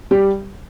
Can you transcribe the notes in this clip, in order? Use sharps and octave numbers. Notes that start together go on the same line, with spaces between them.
G3 G4